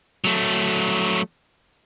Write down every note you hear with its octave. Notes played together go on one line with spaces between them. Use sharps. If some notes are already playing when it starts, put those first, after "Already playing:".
F#3 A3